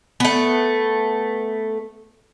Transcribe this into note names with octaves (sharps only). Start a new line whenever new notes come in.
A3 B3